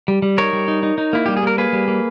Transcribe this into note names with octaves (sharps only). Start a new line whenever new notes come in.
G3
G3
D#4 A#4 C#5
G3
D#4
D#4
D#4
A#3 E4
G3 G4
G#4
A#3 A#4
A#3 G#4 B4
G3
A#3